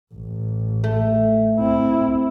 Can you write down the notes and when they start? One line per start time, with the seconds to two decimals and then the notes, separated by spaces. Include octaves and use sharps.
0.14 A1
0.84 A3
1.59 C4 E4